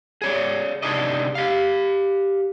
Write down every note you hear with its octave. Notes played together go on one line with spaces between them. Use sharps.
G#4 C#5 D5
C3 D4 D#4 G#4 D5 D#5
G4 F5